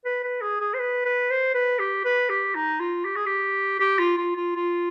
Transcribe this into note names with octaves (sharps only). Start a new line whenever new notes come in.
B4
B4
G#4
G#4
C5
B4
B4
C5
B4
G4
B4
G4
D#4
F4
G4
G#4
G4
G4
F4
F4
F4
F4